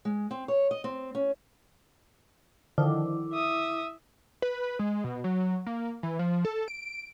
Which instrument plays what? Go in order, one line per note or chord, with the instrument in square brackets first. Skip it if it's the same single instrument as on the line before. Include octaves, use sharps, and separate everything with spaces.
[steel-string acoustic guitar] G#3
C4
C#5
D#5
C4
C#4
[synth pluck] D3 D#3 F3 [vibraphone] E4 D6
[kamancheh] E5 D#6
[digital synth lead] B4
G#3
B2
F#3
A#3
E3
F3
A4
D7